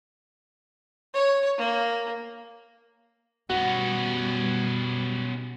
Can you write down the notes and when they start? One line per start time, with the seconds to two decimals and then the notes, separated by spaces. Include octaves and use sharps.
1.14 C#5
1.58 A#3
3.50 B2 G3 B3 C#4 F#4